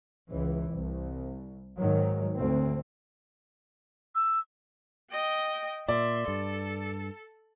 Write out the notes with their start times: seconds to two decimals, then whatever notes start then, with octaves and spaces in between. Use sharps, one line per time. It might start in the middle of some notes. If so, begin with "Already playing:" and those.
0.30 C#2 E3
0.72 C2
1.77 G#2 D#3 F#3
2.37 D2 C4
4.15 E6
5.11 D#5 G5
5.88 A#2 D5 E5 C6
6.28 G2 A4